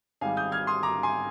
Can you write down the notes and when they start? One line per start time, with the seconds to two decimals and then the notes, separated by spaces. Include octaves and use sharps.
0.21 G#1 G#2 G3 F5 G#5
0.37 D#6 G6
0.52 F6 G#6
0.67 C6 D#6
0.83 A#5 D6
1.03 G#5 C6